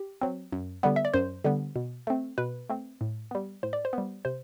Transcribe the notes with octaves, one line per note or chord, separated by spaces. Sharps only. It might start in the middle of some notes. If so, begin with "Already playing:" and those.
Already playing: G4
F#3 C4
F#2
D3 G3 B3
E5
D5
F#2 C5
D3 G3 B3
B2
A3 C4
B2 B4
A3 C4
A2
G3 B3
A2 C5
D5
C5
B3
G3
C3 C5